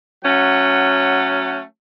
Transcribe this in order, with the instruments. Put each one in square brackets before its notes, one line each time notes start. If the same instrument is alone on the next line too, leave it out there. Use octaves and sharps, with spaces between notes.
[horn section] F#3 A3 C#4 F#5